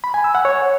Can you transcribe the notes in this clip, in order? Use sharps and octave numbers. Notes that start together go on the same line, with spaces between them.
B5
G#5
E6
F#5
C#5